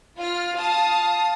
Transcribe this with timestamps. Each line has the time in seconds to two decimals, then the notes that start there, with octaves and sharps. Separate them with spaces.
0.18 F4 F6
0.57 F5 A5 D#6